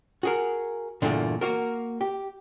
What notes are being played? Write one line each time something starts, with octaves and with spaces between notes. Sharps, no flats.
F#4 G#4 A#4
E2 G2 A#2 D3
A#3 F#4 A#4
G4